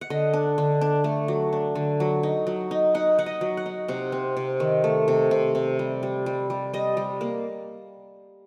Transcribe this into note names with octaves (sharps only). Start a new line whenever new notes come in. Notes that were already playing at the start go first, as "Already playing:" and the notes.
F#5
D3 D#5
D4
D3
D4
A3
F#3
D4
D3
F#3
D#4
F#3
D#4
D#4 F#5
D#4 F#5
D#5
F#3
F#5
D#4
C3 F#5
C4
C3
D#3
A3
C3
C3
C3
G3
G3
G3
G3
G3 D#5
G3
A#3